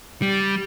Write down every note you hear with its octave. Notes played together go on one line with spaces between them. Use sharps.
G3